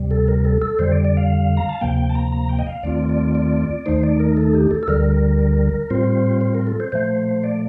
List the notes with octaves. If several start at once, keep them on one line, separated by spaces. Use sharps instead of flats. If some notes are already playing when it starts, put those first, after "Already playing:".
Already playing: D2 C3 G3
A4
A#4
A4
A4
F2 D3 G3 C5
D5
D5
F5
A#5
A5
D2 C3 F3 A#3 G5
G5
A5
A#5
A#5
G5
D#5
F5
D#2 D#3 A3 C4 F4 D5
D5
D5
D#2 D#3 A3 D#4 C5
D5
A#4
A4
G4
A4
A4
D2 D3 G3 A#4
A2 G3 C4 F4 C5
C5
A#4
A4
C5
A#2 F3 A3 C5
D5